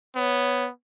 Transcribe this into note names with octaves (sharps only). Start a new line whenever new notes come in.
B3 C#5